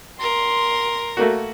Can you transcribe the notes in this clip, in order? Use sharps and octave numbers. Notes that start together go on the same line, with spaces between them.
A#4 C6
A3 A#3 F#4